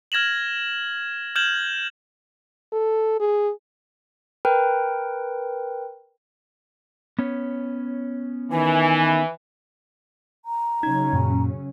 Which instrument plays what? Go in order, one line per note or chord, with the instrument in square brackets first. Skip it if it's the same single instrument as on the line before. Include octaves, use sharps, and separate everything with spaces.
[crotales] F6 G#6 A#6 E7 F#7
F6 G6 G#6 E7 F#7
[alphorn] A4
G#4
[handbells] A#4 B4 G5
[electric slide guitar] B3 C#4 C#5
[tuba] D#3 [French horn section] E3 [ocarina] G#5
[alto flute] A#5
[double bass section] C#3 F#3 C#4 [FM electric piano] D#4 G#6
[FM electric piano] F#2 A#2